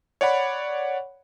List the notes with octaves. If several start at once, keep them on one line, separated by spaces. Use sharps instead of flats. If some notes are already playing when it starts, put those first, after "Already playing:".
C#5 D5 F#5 B5